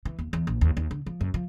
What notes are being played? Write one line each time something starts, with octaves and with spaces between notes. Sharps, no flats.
E3
D#2
E2
A#1
D#2
D#2
D3
F3
F#2
F3